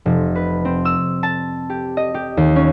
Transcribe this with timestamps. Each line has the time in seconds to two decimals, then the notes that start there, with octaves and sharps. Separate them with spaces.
0.06 F1
0.36 B4
0.65 C4
0.85 E6
1.23 A5
1.70 G4
1.97 D#5
2.14 G4
2.37 D#2
2.56 C#4